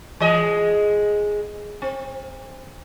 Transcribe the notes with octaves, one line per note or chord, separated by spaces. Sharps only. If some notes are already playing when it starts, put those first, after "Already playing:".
E3 G#3 D#5
C4